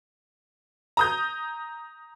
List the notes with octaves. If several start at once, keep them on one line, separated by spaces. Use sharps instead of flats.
A#5 D#6 G6